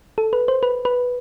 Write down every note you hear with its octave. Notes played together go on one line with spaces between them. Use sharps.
A4
B4
C5
B4
B4